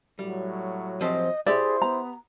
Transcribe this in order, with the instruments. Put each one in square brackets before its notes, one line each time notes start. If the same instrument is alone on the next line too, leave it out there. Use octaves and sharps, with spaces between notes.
[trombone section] A2 F#3 [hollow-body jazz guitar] G3
[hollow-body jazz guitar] F3 C4 G4 [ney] D#5
[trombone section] E4 C5 [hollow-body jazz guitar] G4 E5 [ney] G#4 [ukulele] D5
[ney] B3 [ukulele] A#5